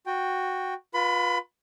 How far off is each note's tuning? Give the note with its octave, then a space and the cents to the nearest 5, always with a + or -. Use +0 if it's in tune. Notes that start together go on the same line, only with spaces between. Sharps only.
F#4 -5 G5 +0
F4 +25 B4 -20 B5 +30